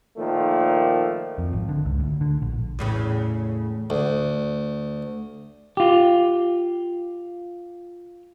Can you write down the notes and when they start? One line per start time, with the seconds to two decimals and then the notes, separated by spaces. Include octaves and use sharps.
0.17 A#2 D#3 F3 A3
1.38 F2
1.53 G#1
1.69 D3
1.86 C#2
2.00 D2
2.21 D3
2.42 A#1
2.79 E2 A2 C#3
3.90 D2
5.77 F4 G4